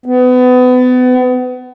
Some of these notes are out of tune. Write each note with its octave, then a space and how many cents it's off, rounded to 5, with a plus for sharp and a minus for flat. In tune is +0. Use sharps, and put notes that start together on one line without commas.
B3 +30